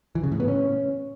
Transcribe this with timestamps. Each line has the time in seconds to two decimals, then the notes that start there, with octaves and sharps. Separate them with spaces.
0.15 E3
0.23 C#3
0.32 A2
0.40 B3
0.48 C#4